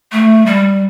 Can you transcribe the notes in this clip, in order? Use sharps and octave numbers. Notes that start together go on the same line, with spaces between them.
A3
G3